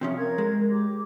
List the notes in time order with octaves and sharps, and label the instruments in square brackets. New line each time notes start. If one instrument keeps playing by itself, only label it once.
[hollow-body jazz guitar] C3 F3 C#4 [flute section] E5 D#6
[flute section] A#4 G#6
[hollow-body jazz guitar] G#3
[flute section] G4 D6